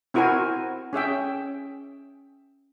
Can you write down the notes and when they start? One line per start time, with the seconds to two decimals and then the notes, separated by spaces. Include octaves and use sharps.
0.14 C4 E4 F#4 A#4 C5 G#5
0.93 C#4 G#4 E5 G5